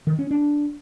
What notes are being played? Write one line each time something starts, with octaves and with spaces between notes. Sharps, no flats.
D#3
C#4
D4